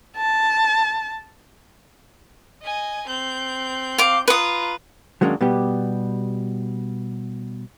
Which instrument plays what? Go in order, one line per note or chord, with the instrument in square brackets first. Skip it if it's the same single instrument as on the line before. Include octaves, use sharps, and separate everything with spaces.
[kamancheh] A5
[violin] D#5 G#5
C4 G6
[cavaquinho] F5 D6
[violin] F4 A#5 [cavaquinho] B4 D#6
[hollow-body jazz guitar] D#3 F#3 G#3 A#3 C#4 D4
B2 G3 B3 G4